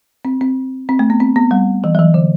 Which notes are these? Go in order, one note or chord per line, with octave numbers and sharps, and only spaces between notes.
C4
C4
C4
A3
B3
C4
B3
G3
E3
F#3
E3
D3